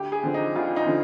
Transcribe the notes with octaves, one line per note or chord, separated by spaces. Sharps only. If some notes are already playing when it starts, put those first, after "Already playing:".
Already playing: D2 G4
G#4
D3 F3 C4
D#4
D2 F4
D#4
D3 F3